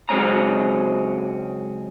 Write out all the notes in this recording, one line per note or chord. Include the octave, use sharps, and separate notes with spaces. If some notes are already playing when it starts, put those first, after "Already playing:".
C#2 F#3 G#3 C4 C#4 A#5